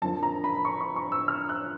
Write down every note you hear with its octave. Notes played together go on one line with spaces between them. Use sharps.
F2 D3 F3 A#3 A5
A#5
B5
C#6
C#6
C#6
E6
F6
F#6